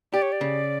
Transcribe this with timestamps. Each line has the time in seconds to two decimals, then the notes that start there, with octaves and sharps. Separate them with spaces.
0.13 G4 D5
0.22 C#5
0.32 D5
0.41 C#3